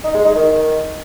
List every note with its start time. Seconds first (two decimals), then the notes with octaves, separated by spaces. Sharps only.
0.04 D#4
0.15 G#3
0.25 D#4
0.35 D#3